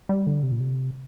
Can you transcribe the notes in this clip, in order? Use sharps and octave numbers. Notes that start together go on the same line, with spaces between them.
G3
D3
C3
A#2
C3